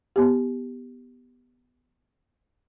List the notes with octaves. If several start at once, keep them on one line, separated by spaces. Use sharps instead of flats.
B3 G4